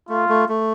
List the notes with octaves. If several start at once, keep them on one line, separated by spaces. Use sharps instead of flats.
A3 F4
A3
A3